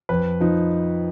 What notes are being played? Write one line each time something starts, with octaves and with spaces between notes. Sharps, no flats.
F2 B4
F3 D#4